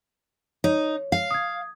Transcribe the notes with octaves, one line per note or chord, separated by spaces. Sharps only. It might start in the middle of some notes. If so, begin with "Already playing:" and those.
D#4 C#5
F5
D#6 G#6